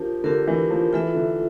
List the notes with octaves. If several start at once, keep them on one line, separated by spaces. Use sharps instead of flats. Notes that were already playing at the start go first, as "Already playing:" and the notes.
Already playing: F3 D4 G4 A#4
D3 D4 G4 A#4
E3
F3
E3 F4 A4 E5
D3